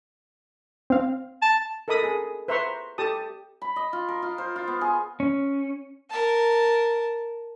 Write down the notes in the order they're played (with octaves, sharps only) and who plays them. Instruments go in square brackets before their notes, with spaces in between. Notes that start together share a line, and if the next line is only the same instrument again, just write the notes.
[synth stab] C4 F5
[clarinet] A5
[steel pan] A4 A#4 D#5 B5 D#6
G#4
B4 C5 E5 A#5 C6 C#6
G4 A4 A5 D#6
[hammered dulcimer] B5
D#5
F4
A#4
F4
C5
F4
B3
G#4
[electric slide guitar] C#4
[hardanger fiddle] A#4 A5